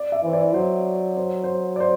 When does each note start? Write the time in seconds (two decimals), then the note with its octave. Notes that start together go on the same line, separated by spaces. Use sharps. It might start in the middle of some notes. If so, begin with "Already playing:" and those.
Already playing: D5
0.12 E5
0.23 E3 C5
0.33 D5
0.54 F#3 C5
1.17 C5
1.44 C5
1.76 D5
1.80 C5